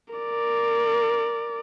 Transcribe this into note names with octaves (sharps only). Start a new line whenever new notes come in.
A#4 D5